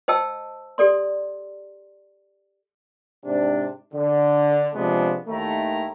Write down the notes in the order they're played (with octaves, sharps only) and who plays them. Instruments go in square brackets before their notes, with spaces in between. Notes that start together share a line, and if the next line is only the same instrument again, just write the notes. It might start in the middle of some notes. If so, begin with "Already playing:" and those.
[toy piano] C5 D#5 G5 A5 E6
G4 A4 D5 C6
[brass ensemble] G#2 C3 D4
D3
C3 F3 G#3 B3 D4
D#2 D#3 A3 E4 A#5